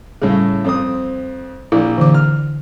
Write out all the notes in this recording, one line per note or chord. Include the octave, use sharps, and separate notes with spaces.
A2 C#3 G3 G#4
F2 C4 D#6
A#1 E4
D3 E3 D6
F6